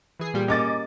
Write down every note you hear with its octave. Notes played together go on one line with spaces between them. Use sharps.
E3 G#4 C7
A#2 G3
A#3 C#4 D#5 D6 A6